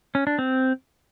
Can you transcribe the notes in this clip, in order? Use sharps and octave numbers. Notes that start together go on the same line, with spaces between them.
C#4
D4
C4